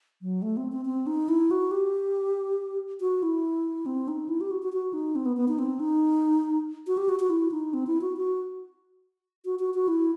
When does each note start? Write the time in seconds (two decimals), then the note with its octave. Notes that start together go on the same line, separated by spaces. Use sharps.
0.22 F#3
0.42 A3
0.57 C4
0.72 C4
0.85 C4
1.07 D#4
1.29 E4
1.51 F#4
1.71 G4
3.01 F#4
3.23 E4
3.86 C4
4.08 D#4
4.29 E4
4.41 G4
4.51 F#4
4.62 F#4
4.73 F#4
4.93 D#4
5.16 C4
5.26 B3
5.37 B3
5.48 D#4
5.59 C4
5.80 D#4
6.87 F#4
6.97 G4
7.09 F#4
7.20 F#4
7.30 E4
7.51 D#4
7.74 C4
7.87 E4
8.01 F#4
8.17 F#4
9.45 F#4
9.59 F#4
9.74 F#4
9.88 E4